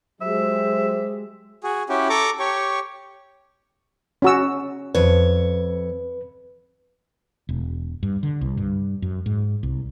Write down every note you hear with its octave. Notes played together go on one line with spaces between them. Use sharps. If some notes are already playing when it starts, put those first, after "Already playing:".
F#3 G#3 G4 C5 E5
F#4 G#4
C#4 E4 F#4 G4
A4 A#5 C#6 D6
G4 C#5 C#6
C#4 F#4 E6
F2 B4 C#5
E1
G2
D3
C2
G2
F#2
G#2
C2